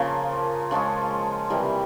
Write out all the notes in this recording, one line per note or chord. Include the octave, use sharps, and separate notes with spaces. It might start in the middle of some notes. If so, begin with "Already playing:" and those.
Already playing: C#3 F3 A#3 G#4 A#4
C#3 F3 G#3 C#4
C3 E3 G3 G#4 A#4